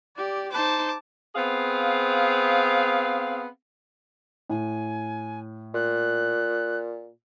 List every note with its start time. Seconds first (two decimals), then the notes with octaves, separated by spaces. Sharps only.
0.17 G4 D5
0.52 D#4 C5 A5 D6
1.35 B3 C4 G#4 F5
4.49 A2 G#5
5.74 A#2 F#6